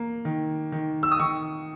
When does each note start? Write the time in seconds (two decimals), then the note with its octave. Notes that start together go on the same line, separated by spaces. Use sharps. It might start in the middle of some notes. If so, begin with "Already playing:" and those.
Already playing: A#3
0.25 D#3
0.72 D#3
1.03 E6
1.12 D#6
1.20 D#3 C#6